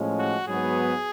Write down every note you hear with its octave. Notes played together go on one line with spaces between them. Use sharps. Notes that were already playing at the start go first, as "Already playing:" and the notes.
Already playing: A2 F3 G#3 C#4
F#4
G#2 F#3 B3 G#4